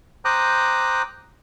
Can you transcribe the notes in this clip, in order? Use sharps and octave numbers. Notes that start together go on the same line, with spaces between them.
C5 G5 A#5 D6 D#6 F#6